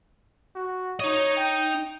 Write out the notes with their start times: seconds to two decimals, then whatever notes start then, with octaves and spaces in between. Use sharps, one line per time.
0.55 F#4
1.00 D#4 C#5 D#5
1.36 G5